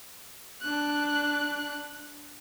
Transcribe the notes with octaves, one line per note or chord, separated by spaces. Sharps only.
D4 F#6